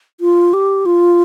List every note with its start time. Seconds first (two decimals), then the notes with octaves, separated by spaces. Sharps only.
0.20 F4
0.53 G4
0.86 F4